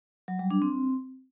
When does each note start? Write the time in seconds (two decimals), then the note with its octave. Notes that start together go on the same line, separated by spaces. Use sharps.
0.28 F#3
0.39 G3
0.51 D4
0.62 C4